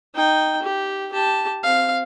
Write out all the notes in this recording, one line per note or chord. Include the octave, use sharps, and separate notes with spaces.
D#4 G5
G4
G4 A5
C4 F5